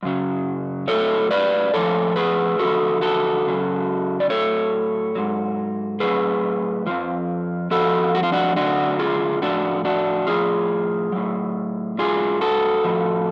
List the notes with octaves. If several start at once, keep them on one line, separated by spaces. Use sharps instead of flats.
F#2 C#3 F#3
A2 F#3 A4 C#5
B4 D5
A2 F3 A4 C#5
G#4 B4
F#2 D3 F3 F#4 A4
F#4 A4
F#2 C#3 F#3
D5
A2 F#3 A4 C#5
G#2 F#3
A2 F#3 G#4 B4
F2 F3
F2 F3 F#4 A4
F#4
F4
D4 F#4
F#2 D3 F#3 D4 F#4
F4 G#4
A2 F3 D4 F#4
D4 F#4
A2 F3 F4 G#4
A2 F#3
G#2 F#3 F4 G#4
F#4 A4
A2 F3